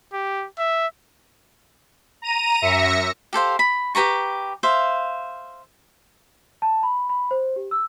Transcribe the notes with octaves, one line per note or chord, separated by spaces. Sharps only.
G4
E5
A#5 D#7
F#2 E5 A#6 C#7
G4 A4 C5 F5
B5
G4 B4 A#5 C#6
C5 E5 F5
A5
B5
B5
C5
G4
E6